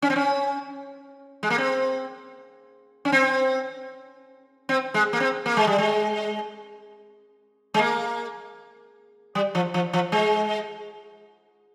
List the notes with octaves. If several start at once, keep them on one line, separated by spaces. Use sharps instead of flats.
C#4
C4
C#4
G#3
A#3
C4
C#4
C4
C4
G#3
A#3
C4
A#3
G#3
G3
G#3
G#3
A#3
G3
F3
F3
F3
G#3